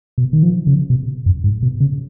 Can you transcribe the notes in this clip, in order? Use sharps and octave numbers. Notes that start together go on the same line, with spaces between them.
B2
D#3
F3
C#3
B2
F#2
G#2
B2
C#3